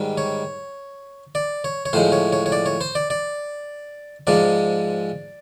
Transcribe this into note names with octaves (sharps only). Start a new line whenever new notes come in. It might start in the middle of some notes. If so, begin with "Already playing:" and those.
Already playing: G#2 D#3 G3
C#5
D5
C#5
C#5
A2 F3 G#3 C5
C#5
C#5
C#5
D5
C#5
C5
D5
D5
G#2 F3 G#3 D5